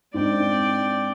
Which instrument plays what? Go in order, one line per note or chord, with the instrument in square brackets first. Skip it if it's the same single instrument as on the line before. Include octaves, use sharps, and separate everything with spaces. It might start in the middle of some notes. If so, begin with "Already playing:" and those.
[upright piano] G#2 C4 D4 [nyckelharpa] D5 G5